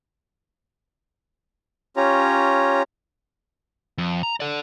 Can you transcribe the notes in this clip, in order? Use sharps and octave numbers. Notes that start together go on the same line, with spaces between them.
C#4 F4 G4 C#5 A#5
F2
A#5
A4 D5